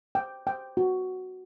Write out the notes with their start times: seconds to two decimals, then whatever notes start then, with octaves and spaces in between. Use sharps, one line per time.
0.15 G5
0.47 G5
0.77 F#4